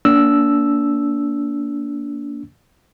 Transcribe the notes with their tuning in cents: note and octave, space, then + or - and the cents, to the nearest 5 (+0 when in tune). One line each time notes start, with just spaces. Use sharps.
A#3 +0 D4 -30 E6 +0